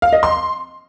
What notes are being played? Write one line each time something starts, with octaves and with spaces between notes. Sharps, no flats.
F5
D#5
C6